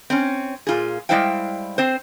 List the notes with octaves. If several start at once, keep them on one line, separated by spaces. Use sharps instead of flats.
C4 C#4
A#2 F4 G#4
G3 G#3 E4 C5 F5 G5
C4 C5